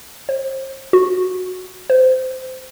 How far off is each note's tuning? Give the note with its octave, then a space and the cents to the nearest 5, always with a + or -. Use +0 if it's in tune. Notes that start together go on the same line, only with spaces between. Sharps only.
C5 +35
F#4 -10
C5 -20